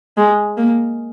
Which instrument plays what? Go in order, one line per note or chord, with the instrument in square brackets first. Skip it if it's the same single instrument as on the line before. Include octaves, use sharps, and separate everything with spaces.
[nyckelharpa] G#3
A#3